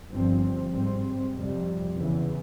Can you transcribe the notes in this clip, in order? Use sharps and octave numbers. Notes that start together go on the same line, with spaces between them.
G1 G2 F3 C4
G#2 G3 C4
F2 C3 G3
E2 C#3 E3